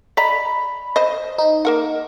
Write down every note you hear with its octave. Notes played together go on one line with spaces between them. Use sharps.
D5 D#5 A#5 B5
C5 D#5
D#4
A#3 A#4 F#5